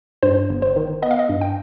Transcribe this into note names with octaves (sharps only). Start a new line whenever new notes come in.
G2 C5
G1
C5
D#3
B3 D#5
F5
D#5
G2
G5